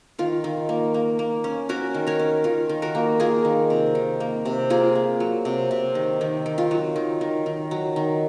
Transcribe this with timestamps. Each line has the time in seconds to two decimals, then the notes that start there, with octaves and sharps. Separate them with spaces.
0.19 D#3 F4
0.44 D#3
0.69 A#3
0.94 A#3
1.19 A#3
1.44 C#4
1.69 C#4 F#4 A#4
1.94 D#3
2.07 A#4 C#5
2.19 C#4
2.44 D#3 F4
2.69 D#3
2.82 F#4 A#4
2.95 A#3
3.20 A#3 F4 G#4
3.45 D#3
3.70 C3
3.95 D#3
4.20 A#3
4.45 C3
4.70 A#3 F4 G#4
4.95 A#3
5.20 F#3
5.45 C3
5.71 C3
5.95 D#3
6.21 D#3
6.46 D#3
6.58 F4
6.71 F#3
6.96 D#3
7.21 D#3
7.46 D#3
7.71 F#3
7.96 D#3